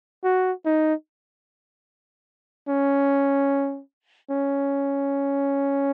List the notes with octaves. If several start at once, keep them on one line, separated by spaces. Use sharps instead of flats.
F#4
D#4
C#4
C#4